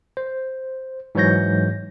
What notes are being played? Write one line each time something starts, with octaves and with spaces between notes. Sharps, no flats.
C5
G#2 E3 F#3 C#5 G6 A#6